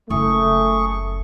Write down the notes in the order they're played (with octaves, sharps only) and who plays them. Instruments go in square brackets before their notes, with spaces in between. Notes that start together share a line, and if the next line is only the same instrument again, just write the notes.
[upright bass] F#1 [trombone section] A3 [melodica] G#4 C#6